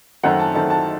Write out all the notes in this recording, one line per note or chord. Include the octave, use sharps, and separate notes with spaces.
F#2 D#3 A3 C4 F#5
A5
F#2 D#3 A3 C4 A5
A5